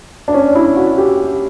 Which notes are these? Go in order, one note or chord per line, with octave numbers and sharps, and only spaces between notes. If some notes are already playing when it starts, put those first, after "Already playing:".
D4
C#4
E4
F#4
G4